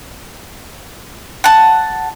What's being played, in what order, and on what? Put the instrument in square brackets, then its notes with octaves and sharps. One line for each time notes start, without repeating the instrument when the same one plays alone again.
[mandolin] F#5 A5